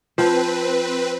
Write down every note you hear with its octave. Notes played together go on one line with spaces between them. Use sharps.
F3 C4 B4